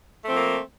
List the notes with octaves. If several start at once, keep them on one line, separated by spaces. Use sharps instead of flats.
F3 A3 A#3 C4